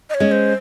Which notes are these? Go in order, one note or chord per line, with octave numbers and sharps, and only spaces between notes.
D#5
C#5
G#3 C#4
C5